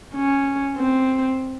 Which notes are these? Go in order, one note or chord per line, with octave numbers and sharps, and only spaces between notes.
C#4
C4